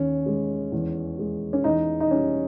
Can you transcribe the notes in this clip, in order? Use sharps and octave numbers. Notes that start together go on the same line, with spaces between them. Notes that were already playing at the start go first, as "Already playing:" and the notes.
Already playing: D#2 C#4
G#3
E2
G#3
C#4
E2 D#4
D#4
G3 C#4